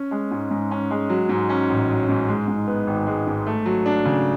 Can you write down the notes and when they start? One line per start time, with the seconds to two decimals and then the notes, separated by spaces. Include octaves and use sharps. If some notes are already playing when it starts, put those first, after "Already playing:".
Already playing: C#4
0.11 G#3
0.31 G#2
0.51 G#2
0.71 C#4
0.91 G#3
1.09 F#3
1.29 G#2
1.49 C#4
1.70 A1
1.89 F#3
2.09 G#2
2.28 G#3
2.48 G#2
2.67 B3
2.87 G#1
3.07 G#3
3.27 G#2
3.46 A3
3.66 F#3
3.86 D4
4.05 C#3